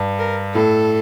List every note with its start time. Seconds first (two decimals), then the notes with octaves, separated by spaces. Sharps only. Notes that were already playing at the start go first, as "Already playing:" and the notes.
Already playing: G2
0.19 A#4
0.54 A2 A4